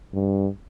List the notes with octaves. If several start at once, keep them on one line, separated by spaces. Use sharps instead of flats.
G2